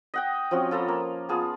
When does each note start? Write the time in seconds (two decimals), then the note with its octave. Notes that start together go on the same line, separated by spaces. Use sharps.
0.14 D#5 F#5 G5
0.51 F3 C4 C#4 F#4
0.71 F4 A4 A#5 B5
0.88 A#3
1.29 B3 F4 G#4 A5